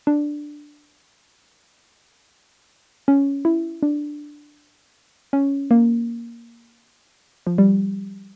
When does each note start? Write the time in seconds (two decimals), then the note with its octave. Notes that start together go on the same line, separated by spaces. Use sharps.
0.07 D4
3.08 C#4
3.45 E4
3.83 D4
5.33 C#4
5.71 A#3
7.47 F3
7.58 G3